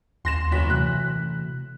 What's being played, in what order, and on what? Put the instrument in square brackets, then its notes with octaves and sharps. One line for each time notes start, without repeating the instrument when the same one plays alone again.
[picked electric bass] D#2 [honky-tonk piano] C6 A#6 E7
[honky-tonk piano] F#1 F#4 B6
[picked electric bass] C3 E3 A3 [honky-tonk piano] F#6